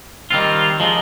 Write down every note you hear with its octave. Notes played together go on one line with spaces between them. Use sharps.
D#3 G3 C4 F4
F3 G#3 D#4